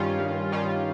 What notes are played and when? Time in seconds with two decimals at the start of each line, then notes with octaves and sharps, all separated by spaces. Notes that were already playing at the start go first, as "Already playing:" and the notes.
Already playing: G2 D#3 G3 C#4 F4
0.19 G2
0.52 D#3 G3 C#4 F4